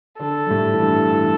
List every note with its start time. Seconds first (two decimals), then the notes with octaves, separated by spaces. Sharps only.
0.19 D3 D4 A4
0.47 G3
0.50 A2 A3
0.73 E3
0.82 G2 G3
1.14 E3